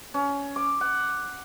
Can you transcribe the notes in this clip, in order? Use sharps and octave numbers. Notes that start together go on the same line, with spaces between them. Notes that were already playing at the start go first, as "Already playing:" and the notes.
C#4
D6
F#5